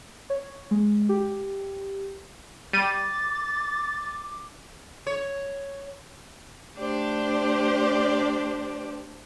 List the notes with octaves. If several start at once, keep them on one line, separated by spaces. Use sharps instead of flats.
C#5
G#3
G4
G3 D6 A6 D#7
C#5
A3 D4 G4 C5 D5